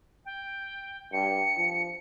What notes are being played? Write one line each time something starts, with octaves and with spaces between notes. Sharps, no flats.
G5
G2 C#7
F3